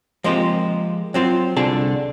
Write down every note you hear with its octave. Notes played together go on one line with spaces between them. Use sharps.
F3 G#3 A#3 C4 F4 G4
F#3 C4 F4
C2 D3 G#4 A5